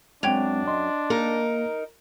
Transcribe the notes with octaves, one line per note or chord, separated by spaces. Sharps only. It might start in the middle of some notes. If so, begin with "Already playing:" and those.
F#2 G#3 C4 D4 G5 G#6 F7
D#5 C6
A#3 D#4 A#4